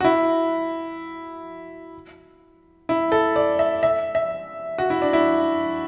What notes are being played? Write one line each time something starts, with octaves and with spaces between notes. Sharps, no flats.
F#4
E4
E4
A4
D5
E5
E5
E5
F#4
E4
D4
E4